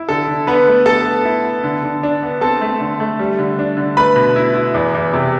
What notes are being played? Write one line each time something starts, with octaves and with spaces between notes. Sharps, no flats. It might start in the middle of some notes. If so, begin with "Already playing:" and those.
Already playing: E4
D3 A4
D3
D3 B3 B4
A3
B3 A4 A5
B3
E4
B3
D3
D3
D4
B3
C4 A4 A5
A3
D3
A3
G3
D3
D4
D3
A3 B4 B5
B2
E4
E4
E2
E2
C3